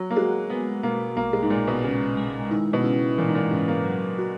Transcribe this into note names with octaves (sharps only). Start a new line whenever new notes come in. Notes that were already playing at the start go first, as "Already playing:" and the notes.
Already playing: F#3 F#4
A#3
G#3 F#4
G#3 B3
B2 A#3
A#1 A#3
G#3
G#2
A#2 G#3
B2
C#3 G#3
G#3
D#3 E4
B2
C#3 E4
A#2 E3
G#2
A#2
G#2 C#3
A#3
F#3
F#4